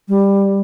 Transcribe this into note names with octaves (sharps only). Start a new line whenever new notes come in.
G3